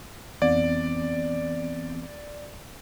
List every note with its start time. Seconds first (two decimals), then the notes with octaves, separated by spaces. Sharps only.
0.42 F2 E3 B3 C4 D5